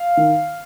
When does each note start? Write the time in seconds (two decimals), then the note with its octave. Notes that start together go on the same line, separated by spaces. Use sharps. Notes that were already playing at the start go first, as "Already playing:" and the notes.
Already playing: F5
0.17 D#3